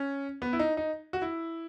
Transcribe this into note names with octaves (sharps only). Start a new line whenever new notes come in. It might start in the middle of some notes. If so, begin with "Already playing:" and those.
Already playing: C#4
B3
E4
D#4
D#4
F#4
E4